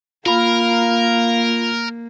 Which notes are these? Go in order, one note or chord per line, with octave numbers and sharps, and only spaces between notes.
A#3 F4 A#4 F5 B5